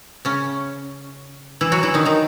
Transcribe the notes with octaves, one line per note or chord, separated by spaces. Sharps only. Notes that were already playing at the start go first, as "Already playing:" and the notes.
C#3 C#4
E3 E4
F#3 F#4
E3 E4
D#3 D#4
D#3 D#4